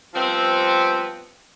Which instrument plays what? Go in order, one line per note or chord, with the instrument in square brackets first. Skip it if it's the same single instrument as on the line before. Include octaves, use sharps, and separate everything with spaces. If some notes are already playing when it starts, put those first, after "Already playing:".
[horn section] F3 G3 B3 C4